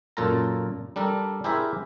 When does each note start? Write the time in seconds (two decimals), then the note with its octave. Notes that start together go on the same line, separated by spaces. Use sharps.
0.17 F#2 A#2 F4 A4 A#4 A#5
0.96 G3 D4 A4 A#4
1.44 E4 G4 G#4 A#4 C5 E5